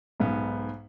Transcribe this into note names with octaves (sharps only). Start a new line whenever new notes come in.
B1 G#2 B3